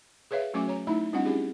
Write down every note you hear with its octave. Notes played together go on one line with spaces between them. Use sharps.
G#4 B4 C#5 E5 F5
F#3 A3 C#4 F#4 G#5 D6
C#5 A#5
A3 D#4 E4 B5
G3 C4 D4 E4 F#4 F#5
C#4 E4 G4 G#4